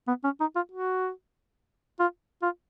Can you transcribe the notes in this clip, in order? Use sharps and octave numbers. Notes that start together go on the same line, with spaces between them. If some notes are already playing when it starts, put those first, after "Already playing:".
B3
C#4
D#4
F4
F#4
F4
F4